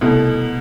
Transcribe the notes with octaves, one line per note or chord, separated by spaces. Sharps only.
C2 B2 A3